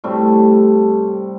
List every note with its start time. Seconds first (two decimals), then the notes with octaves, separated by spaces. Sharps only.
0.04 A2 C3 G3 A3